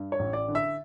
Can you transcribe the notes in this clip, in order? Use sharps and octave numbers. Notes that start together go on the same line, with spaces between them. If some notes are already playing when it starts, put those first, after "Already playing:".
Already playing: G2
C#5
A1
D5
D3
E5